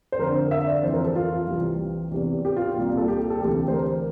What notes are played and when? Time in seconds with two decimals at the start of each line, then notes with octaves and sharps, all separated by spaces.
0.12 C5
0.19 F2 D3 A#4
0.51 E5
0.67 D5
0.83 F2 E3 C5
0.94 A#4
1.04 A4
1.15 F4
1.48 C2 C3 E3
2.12 E2 C3 E3
2.45 G4
2.56 F4
2.77 C2 A#2 F4
2.97 A4
3.08 G4
3.30 A4
3.41 D2 C3 E3 G4
3.57 G4
3.68 C5
3.73 A#4